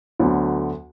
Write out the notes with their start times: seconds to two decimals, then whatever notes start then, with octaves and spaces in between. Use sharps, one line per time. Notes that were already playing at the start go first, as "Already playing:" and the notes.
0.19 D2 D3 F#3 B3